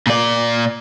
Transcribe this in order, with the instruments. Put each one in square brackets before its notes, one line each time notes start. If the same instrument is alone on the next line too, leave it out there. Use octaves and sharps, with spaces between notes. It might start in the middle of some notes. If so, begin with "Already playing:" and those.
[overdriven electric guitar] A#2 D5